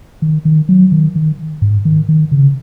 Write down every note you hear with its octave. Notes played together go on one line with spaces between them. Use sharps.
D#3
D#3
F#3
D#3
D#3
G#2
D#3
D#3
C#3